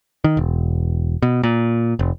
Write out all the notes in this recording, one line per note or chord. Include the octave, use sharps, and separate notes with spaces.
D#3
E1
B2
A#2
F1